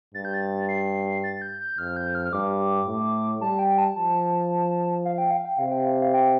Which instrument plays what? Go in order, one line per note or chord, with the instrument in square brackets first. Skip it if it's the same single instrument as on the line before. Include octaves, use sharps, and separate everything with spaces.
[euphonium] G2 [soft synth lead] A6
[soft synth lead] G6
A6
C7
A6
G6
G6
[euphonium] F2 [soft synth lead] F6
[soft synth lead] G6
F6
F6
[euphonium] G2 [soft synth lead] D6
[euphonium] A2
[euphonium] G3 [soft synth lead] A5
[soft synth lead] G5
A5
[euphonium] F3 [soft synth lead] A5
[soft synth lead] F5
G5
F5
G5
[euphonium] C3 [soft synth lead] F5
[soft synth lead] G5
F5
F5
G5